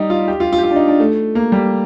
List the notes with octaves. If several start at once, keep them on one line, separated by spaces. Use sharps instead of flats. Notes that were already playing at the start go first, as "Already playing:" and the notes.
Already playing: G3 D#4
F4
G4
F4
F4
G4
F4
D4
D#4
D4
A3
A#3
G3